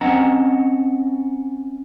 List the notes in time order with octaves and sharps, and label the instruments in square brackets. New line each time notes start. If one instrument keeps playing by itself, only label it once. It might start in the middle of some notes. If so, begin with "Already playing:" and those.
[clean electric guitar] C4 C#4 D#5 F#5 A5 A#5